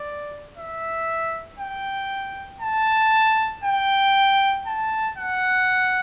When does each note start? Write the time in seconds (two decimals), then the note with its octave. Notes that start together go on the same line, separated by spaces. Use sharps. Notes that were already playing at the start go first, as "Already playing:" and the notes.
Already playing: D5
0.57 E5
1.59 G5
2.61 A5
3.64 G5
4.66 A5
5.17 F#5